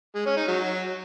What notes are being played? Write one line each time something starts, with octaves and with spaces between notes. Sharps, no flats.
G#3
C#4
D#4
F#3